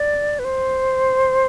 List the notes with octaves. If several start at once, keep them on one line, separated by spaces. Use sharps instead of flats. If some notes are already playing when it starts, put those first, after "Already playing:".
Already playing: D5
B4
C5